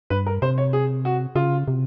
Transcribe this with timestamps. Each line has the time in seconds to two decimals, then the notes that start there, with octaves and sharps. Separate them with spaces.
0.10 G2 B4
0.26 A#4
0.42 C3 C5
0.58 C#5
0.73 G#4
1.05 F#4
1.35 C#3 F4
1.68 C3